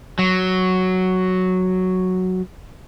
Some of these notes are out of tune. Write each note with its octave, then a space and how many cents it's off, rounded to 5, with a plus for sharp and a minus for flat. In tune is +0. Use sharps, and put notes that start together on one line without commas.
F#3 +0